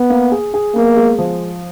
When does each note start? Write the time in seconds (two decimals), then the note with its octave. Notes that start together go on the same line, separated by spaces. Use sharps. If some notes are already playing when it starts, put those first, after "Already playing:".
Already playing: B3
0.10 A#3
0.32 G#4
0.54 G#4
0.75 A#3 B3
0.97 G#3
1.18 F3